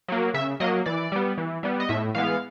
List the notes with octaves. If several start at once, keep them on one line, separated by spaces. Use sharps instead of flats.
F#3 A#3
C#3 E5
F#3 A#3 D#5
E3 D5
G3 B3
E3
G3 B3
D#5
A2 E5
E3 G#3 B3 F5